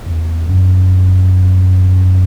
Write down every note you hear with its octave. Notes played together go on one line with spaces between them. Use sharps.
E2
F#2